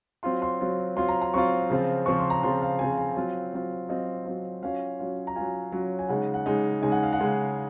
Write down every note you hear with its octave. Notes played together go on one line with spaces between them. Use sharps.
F#3 C4 F4 C6
C6
F#3 C4 F4
F#3 C4 F4 C6
A#5
A#5
F#3 C4 F4 C#6
C#3 F3 C4 F4
C#3 F3 C4 F4 C#6
C6
A#5
C#3 F3 C4 F4 C6
F5
C#3 F3 C4 F4 G#5
G#5
F#3 C4 F4
F#3 C4 F4
F#3 C4 F4 D#5
F#3 C4 F4
F#3 C#4 F4 F5
F#3 C#4 F4
A#5
F#3 C#4 F4 G#5
F#3 C#4 F4
G#5
C#3 G#3 D#4 F#5
F#5
C#3 G#3 D#4
C#3 G#3 D#4 G#5
F#5
F5
F#5
C#3 G#3 D#4